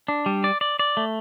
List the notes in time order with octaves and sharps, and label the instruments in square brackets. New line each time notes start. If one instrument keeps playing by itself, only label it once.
[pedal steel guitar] D4
G3
D5
D5
D5
A3